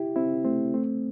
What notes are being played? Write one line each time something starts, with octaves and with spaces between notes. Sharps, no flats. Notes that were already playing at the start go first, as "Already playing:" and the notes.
Already playing: E4 G4
C4 E4
A3 C4
A3 C4